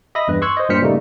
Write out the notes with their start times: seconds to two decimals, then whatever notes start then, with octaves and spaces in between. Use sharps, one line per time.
0.15 D#5 E5 B5 D#6 A#6
0.28 E2 G2 B4
0.42 C6 C#6 E6 F#6 G#6
0.57 C5 D#5
0.70 G2 A#2 C5 F6 B6 C#7
0.82 C#3 G3 A3 A#3 D#4